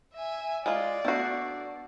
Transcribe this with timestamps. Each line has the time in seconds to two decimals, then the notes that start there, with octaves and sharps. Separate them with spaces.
0.14 E5 G#5
0.66 G#3 F4 D5
1.05 A3 B3 D4 F#4 C7